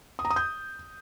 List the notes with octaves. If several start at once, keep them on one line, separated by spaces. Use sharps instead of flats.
D#6
A#5
D#6
G6